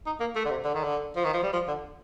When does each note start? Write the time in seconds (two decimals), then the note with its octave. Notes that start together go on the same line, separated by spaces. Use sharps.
0.06 D#4
0.20 A#3
0.36 A3
0.45 D3
0.50 C3
0.64 D3
0.74 D#3
0.84 D3
1.16 F3
1.25 D#3
1.34 F3
1.43 G3
1.53 F3
1.68 D3